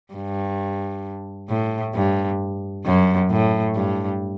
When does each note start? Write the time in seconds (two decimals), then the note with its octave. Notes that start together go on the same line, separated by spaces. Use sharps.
0.14 G2
1.49 A2
1.95 G2
2.85 F#2
3.30 A2
3.75 G2